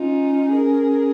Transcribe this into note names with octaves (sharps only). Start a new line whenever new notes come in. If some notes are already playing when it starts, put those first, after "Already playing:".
Already playing: C#4 D#4 F4
G#4 A#4